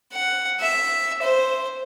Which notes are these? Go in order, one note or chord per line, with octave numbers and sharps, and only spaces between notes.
F#5
E5
C5